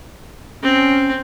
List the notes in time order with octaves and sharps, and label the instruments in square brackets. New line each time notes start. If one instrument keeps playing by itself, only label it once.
[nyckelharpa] C4 [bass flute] C#4